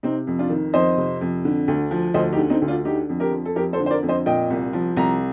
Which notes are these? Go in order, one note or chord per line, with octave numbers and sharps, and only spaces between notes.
C3 C4 D#4
F2
D4 F4
D#3
F2 C5 D#5
C3
F2
D3
D2
F3
D2 C5 D#5
D#4 G4
D3
C4 D#4
D2
D4 F4
D3 D#4 G4
F2
G4 A#4
F3
A4
F2 G4 A#4
A4 C5
D3
C5
A#4 D5
F2
C5 D#5
A#2 D#5 G5
C2
F3
C2 A#5